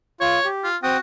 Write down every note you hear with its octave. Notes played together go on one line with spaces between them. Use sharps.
F4 C#5
G4
F4
C4 F#4 G5 D#6